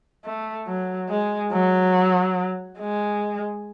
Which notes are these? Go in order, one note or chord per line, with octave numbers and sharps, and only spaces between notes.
A3
F#3
G#3
F#3
G#3